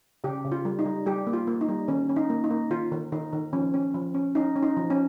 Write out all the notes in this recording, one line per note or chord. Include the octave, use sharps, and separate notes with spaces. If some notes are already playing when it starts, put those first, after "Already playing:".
C#3 G4
C#3
F4
G3
D#4
G3
G3 G4
A#3
F4
A#3
D#4
G3
D#3 C#4
C#4
D#4
A#3
D#4
A#3
D#3 F4
D#3
D#3 D#4
D#3
F3 C#4
C#4
F3
C#4
C#4 D#4
C#4
D#4
F3
C#4